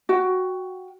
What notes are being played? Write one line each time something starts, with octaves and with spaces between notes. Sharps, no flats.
F#4 G5